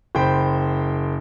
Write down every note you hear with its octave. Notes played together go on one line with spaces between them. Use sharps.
F#1 C5 G5 B5